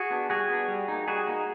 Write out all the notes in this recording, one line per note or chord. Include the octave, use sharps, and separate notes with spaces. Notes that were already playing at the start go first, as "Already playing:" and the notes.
Already playing: F#4 G#4
B3 D4
G3 F#4 G#4
B3 D4
G3
A#3 D#4
G3 F#4 G#4
A#3 D#4